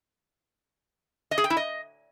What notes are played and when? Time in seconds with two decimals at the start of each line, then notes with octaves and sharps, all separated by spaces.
1.31 D#5
1.38 G#4
1.44 G5
1.50 E4
1.57 D#5